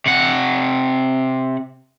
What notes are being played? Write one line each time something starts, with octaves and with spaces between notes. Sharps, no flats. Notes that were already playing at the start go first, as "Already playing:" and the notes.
C3 F#5